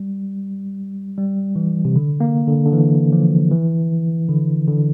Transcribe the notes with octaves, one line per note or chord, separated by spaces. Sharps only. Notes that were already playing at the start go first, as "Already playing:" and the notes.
Already playing: G3
G3
E3
C3
D3
A#3
D3
D3
E3
F3
E3
D3
D3